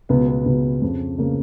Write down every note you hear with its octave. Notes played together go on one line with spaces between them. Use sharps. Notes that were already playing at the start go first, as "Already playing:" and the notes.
C#2 B2 B3
B3
C#2 B2
F2 C#3
C#3 A#3